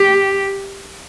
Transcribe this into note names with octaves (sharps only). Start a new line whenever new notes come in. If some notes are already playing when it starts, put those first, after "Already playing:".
Already playing: G4